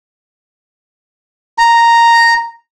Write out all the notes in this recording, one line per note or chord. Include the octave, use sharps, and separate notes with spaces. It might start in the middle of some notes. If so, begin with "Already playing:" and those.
A#5